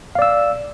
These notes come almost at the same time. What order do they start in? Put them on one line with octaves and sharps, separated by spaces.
F5 D5 E6